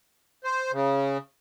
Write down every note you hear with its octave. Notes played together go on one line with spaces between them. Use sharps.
C5
C#3